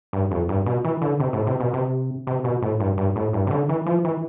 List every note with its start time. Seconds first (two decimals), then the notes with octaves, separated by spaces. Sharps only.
0.13 G2
0.31 F2
0.49 G2
0.66 B2
0.85 E3
1.02 D3
1.20 C3
1.33 A2
1.47 C3
1.60 B2
1.73 C3
2.27 C3
2.44 B2
2.62 A2
2.80 G2
2.98 G2
3.16 A2
3.33 G2
3.47 C3
3.51 D3
3.69 E3
3.86 F3
4.05 E3